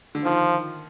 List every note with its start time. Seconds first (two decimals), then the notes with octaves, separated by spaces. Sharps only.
0.15 D3
0.24 D#3 F3